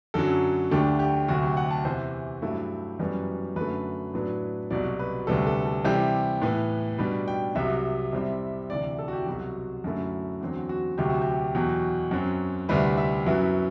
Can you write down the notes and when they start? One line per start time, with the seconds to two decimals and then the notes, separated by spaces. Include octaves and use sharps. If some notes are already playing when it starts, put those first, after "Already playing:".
0.14 F#2 D3 F#3 A4
0.71 D2 D3 A3 D4 G4
0.99 G4
1.28 D2 C3 F#3 F#4
1.43 G4
1.57 F#5
1.71 A5
1.85 E2 C3 E3 C5
2.42 G2 F#3 A3 E4
2.99 F#2 E3 G3 B3
3.56 F#2 D3 A3 B4
4.14 A2 F#3 B3 D4
4.71 C2 B2 F#3 D5
4.99 B4
5.27 D2 C3 G3 B3 A4
5.47 A4
5.66 A4
5.85 C3 E3 G3 C4 E4 G4
6.42 A2 E3 B3
6.98 B2 G3 D4 B4
7.28 G5
7.55 C2 C3 F#3 E5
8.13 C3 G3 C4 E4
8.70 D2 C3 E3 D5
8.99 A4
9.08 F#4
9.13 G4
9.26 C2 B2 F#3 F#4
9.84 F#2 D3 A3 E4
10.41 E2 D3 F#3 C4
10.69 F#4
10.98 D2 C3 F#3 G4
11.10 F#4
11.22 G4
11.55 E2 B2 F#3
12.11 F#2 F#3 C4
12.69 D2 C3 G3 C4 E4 B4
12.98 E5
13.26 F#2 F#3 B3 E4